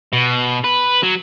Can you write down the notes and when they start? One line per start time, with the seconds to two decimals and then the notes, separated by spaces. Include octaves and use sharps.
0.13 B2
0.64 B4
1.03 F#3